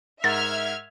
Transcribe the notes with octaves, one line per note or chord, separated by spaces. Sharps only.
G#2 A#4 E5 F#5 F6 G#6 A6